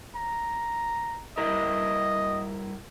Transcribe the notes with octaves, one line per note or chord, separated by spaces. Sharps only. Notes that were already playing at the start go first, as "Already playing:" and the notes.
A#5
G2 E4 A#4 D#5